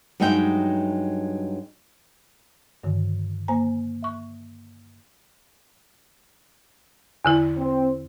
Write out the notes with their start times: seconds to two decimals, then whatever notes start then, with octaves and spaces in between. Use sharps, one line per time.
0.20 G2 F#3 G#3 D#4 E5 G5
2.84 G2 D3 D#3
3.48 A#3 C5 G#5 A#5
4.03 E5 C#6
7.25 E2 D3 E4
7.57 C4